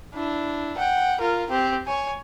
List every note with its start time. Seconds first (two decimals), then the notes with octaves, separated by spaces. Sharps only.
0.14 D4 E4
0.78 F#5 G5
1.20 F4 A#4
1.51 C4 G4
1.87 C#5 G#5